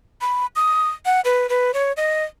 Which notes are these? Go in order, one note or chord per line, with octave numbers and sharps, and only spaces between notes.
B5
D#6
F#5
B4
B4
C#5
D#5